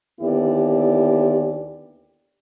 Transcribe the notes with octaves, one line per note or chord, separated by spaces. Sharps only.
D#2 D3 B3 E4 G4 D5